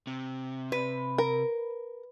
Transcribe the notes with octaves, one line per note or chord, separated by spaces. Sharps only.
C3
B4
A#4